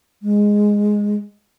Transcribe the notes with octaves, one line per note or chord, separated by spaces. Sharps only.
G#3